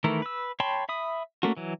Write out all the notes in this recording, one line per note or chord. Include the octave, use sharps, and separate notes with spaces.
D#3 E3 A3 E4 A#4
B4 E6
C#5 G5 A5 B5 C6
E5 B5 D#6
A3 A#3 C#4 F#4
E3 F#3